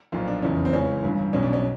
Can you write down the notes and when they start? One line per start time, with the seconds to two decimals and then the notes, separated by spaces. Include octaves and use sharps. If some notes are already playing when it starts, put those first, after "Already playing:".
0.12 B1 A#2 F3 F4
0.28 D4
0.42 F1 E2 C#3 E3 C#4
0.65 C4
0.73 C#2 C#3 E3 C#4
1.03 G1 G2 E3
1.33 B1 B2 C#4
1.43 D4
1.53 C#4